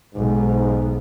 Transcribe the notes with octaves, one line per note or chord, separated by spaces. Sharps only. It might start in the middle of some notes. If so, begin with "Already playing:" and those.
B1 G#2